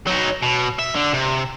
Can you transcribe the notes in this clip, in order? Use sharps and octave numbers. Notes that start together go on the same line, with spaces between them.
F#3 D#4
B2
E5
D3
C3